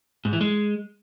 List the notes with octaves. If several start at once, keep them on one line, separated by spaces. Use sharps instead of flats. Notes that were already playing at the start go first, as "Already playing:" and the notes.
G#2
E3
G#3